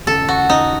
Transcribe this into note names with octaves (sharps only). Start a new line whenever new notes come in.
D#2 C#3 A3 C#4 A4
F#4
D#4